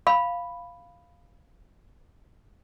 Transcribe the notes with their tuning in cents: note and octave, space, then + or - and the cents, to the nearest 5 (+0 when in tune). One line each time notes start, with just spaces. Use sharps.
F5 +0 B5 +0